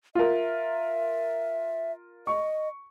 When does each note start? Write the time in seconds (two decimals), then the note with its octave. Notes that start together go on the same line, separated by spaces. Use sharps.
0.15 F4 A#4 E5
2.27 D#5 C#6